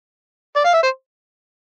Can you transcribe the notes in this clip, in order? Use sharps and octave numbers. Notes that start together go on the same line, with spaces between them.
D5
F5
E5
C5